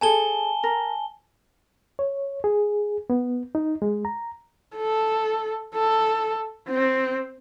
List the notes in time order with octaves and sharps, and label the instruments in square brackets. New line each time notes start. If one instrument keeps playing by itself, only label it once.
[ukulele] G#4 A4 C#5 [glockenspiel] G#5 A5 G7
[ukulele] A#4
[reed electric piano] C#5
G#4
B3
D#4
G#3
A#5
[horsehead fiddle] A4
A4
C4